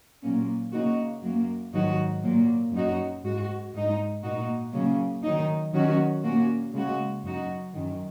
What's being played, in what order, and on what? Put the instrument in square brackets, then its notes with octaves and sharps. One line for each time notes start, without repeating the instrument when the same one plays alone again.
[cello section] A#2 F#3 A#3 C#4
C#3 A#3 D#4 F#4
F#2 F#3 A#3
G#2 D#3 F#3 D#4 F#4
A#2 F#3 A#3
F#2 F#3 D#4 F#4
G#2 G#3 F#4
G#2 G#3 D#4
A#2 A#3 D#4 F#4
C#3 F#3 A#3 C#4
D#3 F#3 D#4
D#3 F#3 C#4 F#4
A#2 A#3 C#4 F#4
C#3 G#3 F#4
F#2 F#3 D#4 F#4
F#2 D#3 F#3